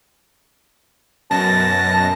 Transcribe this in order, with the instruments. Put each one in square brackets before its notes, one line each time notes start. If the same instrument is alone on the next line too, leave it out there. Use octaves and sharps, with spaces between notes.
[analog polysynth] F#2 B2 A#6 [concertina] A5